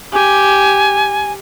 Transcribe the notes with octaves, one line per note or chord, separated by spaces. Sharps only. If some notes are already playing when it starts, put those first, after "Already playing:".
G4 G#5